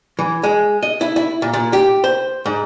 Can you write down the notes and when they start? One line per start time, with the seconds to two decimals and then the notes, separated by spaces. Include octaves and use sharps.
0.19 E3
0.43 G#3
0.83 D#5
1.01 E4
1.16 E4
1.42 A#2
1.53 A#2
1.73 G4
2.04 C5
2.46 G#2